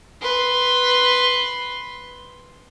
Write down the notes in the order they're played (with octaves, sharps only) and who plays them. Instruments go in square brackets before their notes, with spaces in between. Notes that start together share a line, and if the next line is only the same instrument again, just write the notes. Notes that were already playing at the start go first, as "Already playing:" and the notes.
[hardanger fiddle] B4 C6